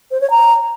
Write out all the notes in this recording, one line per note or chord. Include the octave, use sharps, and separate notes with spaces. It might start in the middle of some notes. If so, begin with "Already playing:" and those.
C5
C#5
A#5